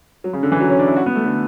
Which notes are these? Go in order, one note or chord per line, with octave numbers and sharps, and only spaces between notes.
F#3
C#3
D3
E3
F#3
C#4
D4
E4
F#4
B3
A3
D3